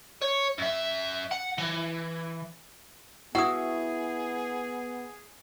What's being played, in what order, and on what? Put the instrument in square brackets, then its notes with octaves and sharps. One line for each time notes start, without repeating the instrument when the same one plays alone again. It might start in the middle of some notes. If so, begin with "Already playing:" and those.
[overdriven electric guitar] C#5
F#2 E5
F#5
E3
[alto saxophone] B3 [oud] E4 F#4 [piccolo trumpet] G#4 [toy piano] F#5 D#6